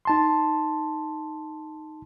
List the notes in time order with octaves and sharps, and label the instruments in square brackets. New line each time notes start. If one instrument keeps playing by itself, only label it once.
[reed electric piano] D#4 A5 C6